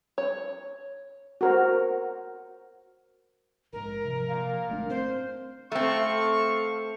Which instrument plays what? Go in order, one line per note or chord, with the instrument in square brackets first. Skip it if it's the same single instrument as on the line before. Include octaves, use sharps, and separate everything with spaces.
[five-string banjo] C#5
[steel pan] F#4 A#4 C5
[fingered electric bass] A#1 G#2 [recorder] A#4
[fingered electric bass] C3 F3
[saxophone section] A#2 D5 F5
[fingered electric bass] G#1 A3 D4
[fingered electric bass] C4 [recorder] C5
[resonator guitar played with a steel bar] A3 C4 [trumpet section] A4 F5 C#6